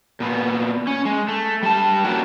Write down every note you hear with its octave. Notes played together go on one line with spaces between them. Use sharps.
A#2 B3
C#4
G#3
A3
G3 A5
A3 A#3 C#4 D4 E4 F#4